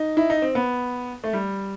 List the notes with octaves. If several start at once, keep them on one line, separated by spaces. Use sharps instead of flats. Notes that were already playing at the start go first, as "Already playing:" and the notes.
Already playing: D#4
E4
D#4
C4
B3
A3
G3